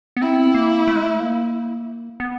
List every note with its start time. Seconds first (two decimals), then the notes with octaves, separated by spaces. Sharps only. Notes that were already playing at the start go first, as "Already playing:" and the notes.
0.17 B3
0.21 C4 E4
0.54 A#3
0.87 A3
0.96 G#3
1.03 A3
1.20 A#3
2.20 B3